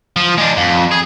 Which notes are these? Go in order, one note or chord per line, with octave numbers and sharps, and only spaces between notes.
F3
G#3 D4
F2
G#4